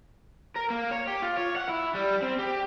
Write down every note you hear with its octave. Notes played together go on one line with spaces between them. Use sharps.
A#4
A#3
C#5
G4
F4
C#5
F#5
E4
G3
C4
G4